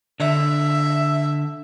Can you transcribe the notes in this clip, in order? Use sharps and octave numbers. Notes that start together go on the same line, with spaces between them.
D3 E5